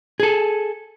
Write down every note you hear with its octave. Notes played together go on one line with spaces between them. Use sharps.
G#4 A4